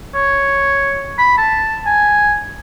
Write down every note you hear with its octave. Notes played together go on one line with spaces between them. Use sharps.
C#5
B5
A5
G#5